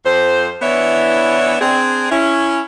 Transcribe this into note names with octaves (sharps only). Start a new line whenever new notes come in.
F2 C5
E3 B3 D4 E4 C#5 E5
C4 D4 G#4
C#4 E4